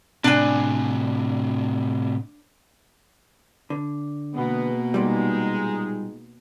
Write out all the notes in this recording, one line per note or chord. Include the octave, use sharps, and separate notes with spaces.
A2 C3 D4 G#5
D3
B2 G#3 A#3 B3
A#2 G3 G#3 D#4